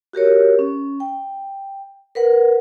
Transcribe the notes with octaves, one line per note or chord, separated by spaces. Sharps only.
F#4 G4 A#4 C#5
C#4
G5
A#4 B4 F#5